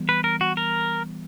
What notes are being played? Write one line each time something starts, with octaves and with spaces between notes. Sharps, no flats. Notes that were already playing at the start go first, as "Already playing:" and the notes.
Already playing: E3 G3 B3
B4
A#4
F#4
A#4